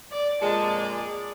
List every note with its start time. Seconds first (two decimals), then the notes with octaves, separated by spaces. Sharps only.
0.11 D5
0.42 F2 A#2 G#3 A5
0.77 D5